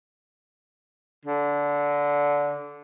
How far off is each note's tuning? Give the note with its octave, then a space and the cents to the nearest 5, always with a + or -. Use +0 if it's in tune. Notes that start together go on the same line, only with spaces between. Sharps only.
D3 -20